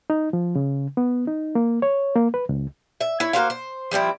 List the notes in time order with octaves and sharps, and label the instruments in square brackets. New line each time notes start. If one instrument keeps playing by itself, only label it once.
[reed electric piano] D#4
F3
C#3
B3
D#4
A#3
C#5
A#3
B4
C#2
[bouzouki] E5
E4 C#5
A#3 F#4 C5 F5
C5
F3 G3 C4 E4